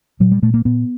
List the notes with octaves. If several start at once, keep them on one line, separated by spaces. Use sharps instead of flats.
A#2 F#3
G3
A#2 A3
A#3
A#2 B3